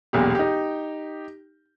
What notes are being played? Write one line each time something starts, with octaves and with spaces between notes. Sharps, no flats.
E1 B1 A#2 G4
D#4 G4